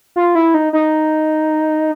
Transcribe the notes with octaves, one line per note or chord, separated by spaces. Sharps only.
F4
E4
D#4
D#4